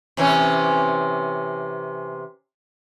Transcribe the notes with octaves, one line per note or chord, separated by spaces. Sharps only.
C3 E3 C#4